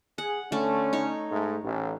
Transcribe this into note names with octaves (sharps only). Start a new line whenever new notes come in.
G#4 F#5
D3 A3 C#4
D#4 C#5
G#2 A3
A1